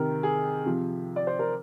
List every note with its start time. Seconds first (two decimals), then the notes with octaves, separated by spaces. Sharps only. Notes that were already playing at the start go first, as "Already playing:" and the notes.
Already playing: C3 D#3 A#4
0.23 G#4
0.66 C3 F3
1.16 D5
1.27 C5
1.39 A#4